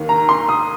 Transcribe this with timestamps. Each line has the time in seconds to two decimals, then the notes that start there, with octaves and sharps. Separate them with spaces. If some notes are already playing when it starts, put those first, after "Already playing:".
Already playing: D#2 D#3
0.09 A#5
0.29 C6
0.49 D#6